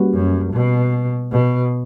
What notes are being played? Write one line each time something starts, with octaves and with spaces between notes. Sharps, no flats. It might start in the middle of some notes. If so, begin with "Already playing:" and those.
Already playing: G3 A#3 C#4 F#4 B4
F#2
B2
B2